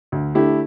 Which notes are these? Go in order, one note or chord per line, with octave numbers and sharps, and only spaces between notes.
D2
D3 A3 E4 G4